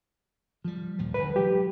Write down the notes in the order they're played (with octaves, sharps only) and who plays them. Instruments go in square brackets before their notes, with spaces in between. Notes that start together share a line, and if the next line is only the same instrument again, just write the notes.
[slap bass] F3 G3
D#2 A#2 F3
[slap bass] B1 D3 G3 [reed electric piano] B4
[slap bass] E3 F#3 G#3 [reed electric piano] G4